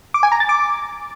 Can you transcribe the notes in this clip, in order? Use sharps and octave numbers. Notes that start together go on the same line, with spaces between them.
D6
G#5
A#5
A6
D6